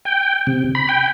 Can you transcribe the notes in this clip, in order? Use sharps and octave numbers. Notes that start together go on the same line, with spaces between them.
G5
C3
B5
G5